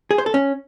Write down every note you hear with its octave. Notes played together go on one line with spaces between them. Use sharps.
G#4
C5
A4
C#4